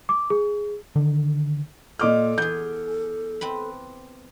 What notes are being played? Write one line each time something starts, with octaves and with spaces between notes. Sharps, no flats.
D6
G#4
D3 D#3
A#2 A4 D#5 D6 F6
E2 G#4 G6
C4 B4 B5